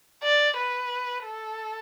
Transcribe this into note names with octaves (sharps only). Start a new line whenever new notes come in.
D5
B4
A4